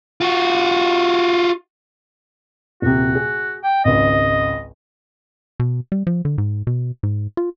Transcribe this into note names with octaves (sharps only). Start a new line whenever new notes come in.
F4 F#4
D#1 C3 F#4
G#4
G5
G#1 C#2 D#5
B2
G3
F3
D3
G#2
B2
G#2
F4